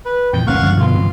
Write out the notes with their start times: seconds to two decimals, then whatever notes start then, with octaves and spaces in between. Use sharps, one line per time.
0.05 B4
0.33 F2 A#2 E3 G5
0.47 G1 C#2 D#3 A#3 C#4 F5 F#5 C#6
0.62 G2 D3 F3
0.80 B2 B3 F4
0.94 G#2 C3 E3